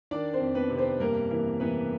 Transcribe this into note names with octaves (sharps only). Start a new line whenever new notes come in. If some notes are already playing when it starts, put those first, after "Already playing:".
D#3 D4 D5
C4 C5
F2
B3 B4
C3
C4 C5
G2 A#3 A#4
E3 A#3 A#4
E3 B3 B4